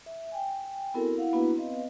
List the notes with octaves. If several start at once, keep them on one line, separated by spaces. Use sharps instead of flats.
E5
G5 G#5
B3 C4 E4 F#4 A4 A#4
E4 F5 F#5
A#3 B3 D4 E4 F#4 B4
B3 C4 B4 D#5 F5